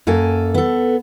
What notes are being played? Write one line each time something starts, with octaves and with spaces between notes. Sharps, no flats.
F#2 A#3 A4 G#5
B3 A4